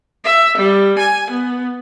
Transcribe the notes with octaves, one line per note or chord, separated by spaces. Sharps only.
E5
G3
G#5
B3